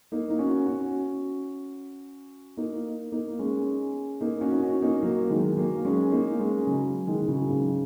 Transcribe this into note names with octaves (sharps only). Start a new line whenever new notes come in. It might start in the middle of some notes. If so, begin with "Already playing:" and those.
A#3 D#4
D#4
C#4 F#4
C#4 F#4
A#3 D#4
A#3 D#4
G#3 C#4
A#3 D#4
C#4 F#4
D#4
C#4 F#4
A#3 D#4
F#3 A#3
D#3 G#3
F#3 A#3
G#3 C#4
A#3 D#4
G#3 C#4
C#3 F#3
D#3 G#3
D#3
C#3 F#3
G#2 C#3